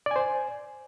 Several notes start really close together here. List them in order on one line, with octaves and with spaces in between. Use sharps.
D5 G#5 C5